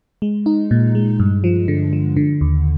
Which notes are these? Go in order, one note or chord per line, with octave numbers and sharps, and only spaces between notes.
G#3
D#4
A#2
G#3
G2
F3
D3
F3
D3
D#2